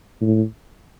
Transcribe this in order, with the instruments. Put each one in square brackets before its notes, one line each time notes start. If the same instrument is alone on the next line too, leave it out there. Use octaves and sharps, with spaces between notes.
[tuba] A2